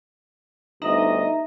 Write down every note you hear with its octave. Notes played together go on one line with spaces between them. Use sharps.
G1 D2 D#4 D#5 E5 A#5